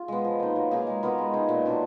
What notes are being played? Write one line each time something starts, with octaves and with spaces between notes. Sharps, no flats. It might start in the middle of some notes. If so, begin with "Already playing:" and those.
Already playing: F4 G#4
G#3 B3
F3
A#3 D#4
F#3
A#3 D#4 G#4
G#3
B3 F4 A#4
G#3
D#4 G#4
A#2
F#3 D4 F4